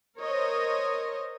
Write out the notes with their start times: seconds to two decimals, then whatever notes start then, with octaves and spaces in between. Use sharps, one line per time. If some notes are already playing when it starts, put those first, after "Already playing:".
0.18 A#4 C5 C#5 D#5